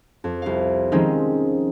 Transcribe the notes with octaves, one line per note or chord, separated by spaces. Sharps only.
F2
C2 F5
D#3 F3 G#3 C4 C#4 D#4